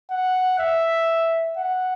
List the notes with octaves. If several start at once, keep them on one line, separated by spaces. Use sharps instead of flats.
F#5
E5
F#5